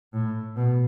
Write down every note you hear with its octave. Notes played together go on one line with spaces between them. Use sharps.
A2
B2